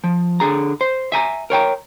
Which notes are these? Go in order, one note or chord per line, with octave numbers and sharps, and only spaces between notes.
F3
D3 G#4 A#5
C5
E5 G#5 A#5
A#4 C#5 G5 A#5